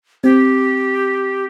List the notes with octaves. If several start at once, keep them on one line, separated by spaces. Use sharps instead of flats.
C4 G4